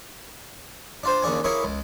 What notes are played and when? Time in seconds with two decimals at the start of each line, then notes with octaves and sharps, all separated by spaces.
1.03 D4 F4 C5
1.22 D#2 C#3 D4 G#5
1.44 A#3 E4 G#4 C#5
1.63 C#2